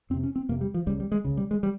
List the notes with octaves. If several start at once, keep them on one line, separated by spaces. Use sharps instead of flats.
F2 C3 C4
C#4
C4
F2 C3 A#3
G3
F3
C#2 C#3 G3
G3
G#3
C#2 C#3
G3
G#3
G3